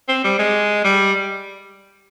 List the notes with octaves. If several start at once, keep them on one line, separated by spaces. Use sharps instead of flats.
C4
G3
G#3
G3